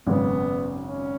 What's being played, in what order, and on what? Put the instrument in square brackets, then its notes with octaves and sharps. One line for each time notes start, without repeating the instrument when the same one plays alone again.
[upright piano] G#1 F#2 C#3 [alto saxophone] B3
[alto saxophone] C#4